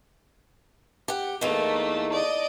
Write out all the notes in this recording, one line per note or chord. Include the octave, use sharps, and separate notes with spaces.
G4 F#5
E2 A3 A#3 D#4
D5 D#5